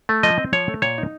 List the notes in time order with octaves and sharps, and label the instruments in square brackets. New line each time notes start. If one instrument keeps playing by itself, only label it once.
[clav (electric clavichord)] A3
F3 D#5
C4
F3 C#5
A3
A#2 C#5
D#4